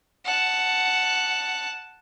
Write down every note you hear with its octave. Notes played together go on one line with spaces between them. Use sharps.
F#5 A5